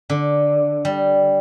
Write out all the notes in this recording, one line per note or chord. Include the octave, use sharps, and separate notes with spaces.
D3
G3